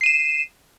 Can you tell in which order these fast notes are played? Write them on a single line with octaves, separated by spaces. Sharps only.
C7 D#7 E7